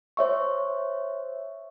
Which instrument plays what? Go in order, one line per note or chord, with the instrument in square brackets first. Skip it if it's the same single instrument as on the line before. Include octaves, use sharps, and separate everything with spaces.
[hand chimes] C5 C#5 E5 C#6